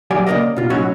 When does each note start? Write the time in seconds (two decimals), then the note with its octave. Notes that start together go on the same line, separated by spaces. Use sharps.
0.11 F#3 G4 D5 G#5
0.27 C#3 A#3 A#4 D5 D#5
0.56 B2 F4
0.70 C#2 A2 F#3 C#4 D#4 F#4